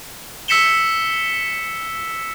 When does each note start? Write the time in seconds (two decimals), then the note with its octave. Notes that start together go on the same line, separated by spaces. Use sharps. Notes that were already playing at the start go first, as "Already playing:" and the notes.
0.48 E6 B6 C#7 E7 G7